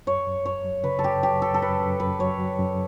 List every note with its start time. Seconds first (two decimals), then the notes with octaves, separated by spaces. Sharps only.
0.06 F#2 C#5
0.27 F#2
0.46 F#2 C#5
0.65 F#3
0.84 C#3 B4
0.99 A4
1.04 F#2 G4
1.23 F#3 G4
1.42 F#2 A4
1.54 A4
1.62 F#2 B4
1.80 F#2
2.00 F#2 B4
2.19 F#3 C#5
2.38 F#3
2.59 F#2